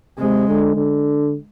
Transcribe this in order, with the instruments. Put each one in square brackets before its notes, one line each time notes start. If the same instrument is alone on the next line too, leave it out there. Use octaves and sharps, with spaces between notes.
[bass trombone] C3 [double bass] G#3
[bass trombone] D3
D3